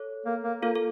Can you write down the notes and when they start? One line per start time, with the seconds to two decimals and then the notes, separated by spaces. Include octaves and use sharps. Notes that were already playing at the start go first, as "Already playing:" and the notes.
Already playing: A4 C#5
0.26 A#3
0.44 A#3
0.62 A#3 F4 A4
0.75 A4